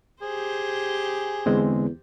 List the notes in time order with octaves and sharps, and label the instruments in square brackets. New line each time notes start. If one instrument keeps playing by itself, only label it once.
[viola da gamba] G4 C5 [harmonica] G#4
[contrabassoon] E2 [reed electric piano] D3 G#3 C4